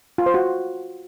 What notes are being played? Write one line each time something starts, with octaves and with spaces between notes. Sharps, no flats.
F4
C5
F#4